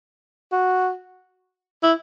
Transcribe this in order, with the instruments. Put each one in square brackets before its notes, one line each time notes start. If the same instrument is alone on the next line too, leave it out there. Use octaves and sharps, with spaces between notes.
[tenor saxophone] F#4
E4